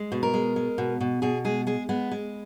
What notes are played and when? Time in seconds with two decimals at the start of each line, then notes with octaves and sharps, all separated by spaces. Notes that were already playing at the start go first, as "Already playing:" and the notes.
Already playing: G#3
0.12 B2
0.23 A#4
0.34 G#3
0.56 G#3
0.78 B2
1.00 B2
1.22 B2 G#4
1.45 G#3 G#4
1.67 G#3 G#4
1.89 G#3 B3
2.11 G#3